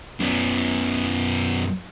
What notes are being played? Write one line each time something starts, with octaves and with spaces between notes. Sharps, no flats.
F#2 B3